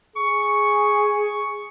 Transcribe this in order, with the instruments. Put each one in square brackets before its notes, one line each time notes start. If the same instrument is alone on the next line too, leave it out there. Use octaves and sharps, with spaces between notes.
[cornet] G#4 [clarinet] C#6